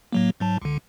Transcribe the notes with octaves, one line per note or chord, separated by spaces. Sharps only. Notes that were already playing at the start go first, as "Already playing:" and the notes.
A2 F#3 A#3
G#2 F#3 A5
C#2 D3